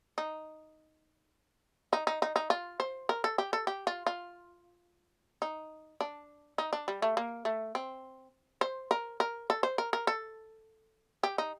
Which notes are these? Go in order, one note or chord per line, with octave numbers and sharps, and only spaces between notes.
D#4
D#4
D#4
D#4
D#4
F4
C5
A#4
A4
G4
A4
G4
F4
F4
D#4
D4
D#4
D4
G3
A3
A#3
A3
C4
C5
A#4
A#4
A4
C5
A#4
A#4
A4
G4
D#4